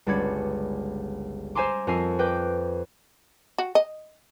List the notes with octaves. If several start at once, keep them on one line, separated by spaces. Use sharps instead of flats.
G1 C#2 D5 B5 G#6 C#7
C5 E5 G#5 A#5 C6 D6
F2 A#4 D#5 G#5 E6 C7
B4 D#5 G5 D6 G6
F#4
D#5